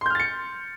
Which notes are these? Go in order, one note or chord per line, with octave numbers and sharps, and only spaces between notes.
C6 F6 G6 A6 C#7